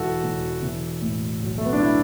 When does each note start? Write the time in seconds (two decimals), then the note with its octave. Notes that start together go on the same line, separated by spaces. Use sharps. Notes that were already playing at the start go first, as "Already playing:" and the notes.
Already playing: E1 E3 F#4 A4
0.24 E1
0.63 E3
1.02 A2
1.42 B1
1.58 A3
1.66 B3
1.73 D4
1.80 E4